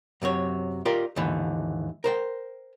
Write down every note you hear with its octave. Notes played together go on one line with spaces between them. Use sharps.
F#2 C3 F#3 C#5
F4 G4 A#4 D5
D#2 G#2 D3 E3
A#4 C5 G5